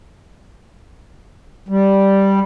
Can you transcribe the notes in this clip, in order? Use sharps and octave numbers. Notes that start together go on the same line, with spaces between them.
G3